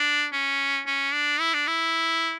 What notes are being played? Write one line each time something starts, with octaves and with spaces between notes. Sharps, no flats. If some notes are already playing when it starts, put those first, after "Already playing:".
Already playing: D4
C#4
C#4
D4
E4
D4
E4